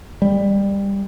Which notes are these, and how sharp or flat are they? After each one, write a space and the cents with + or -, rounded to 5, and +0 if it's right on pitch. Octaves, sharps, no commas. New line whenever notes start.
G3 +20